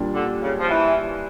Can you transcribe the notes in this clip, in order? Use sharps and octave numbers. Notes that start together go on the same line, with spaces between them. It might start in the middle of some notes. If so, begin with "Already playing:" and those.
Already playing: A#2 G3 D4
D3
C#3
F3
E3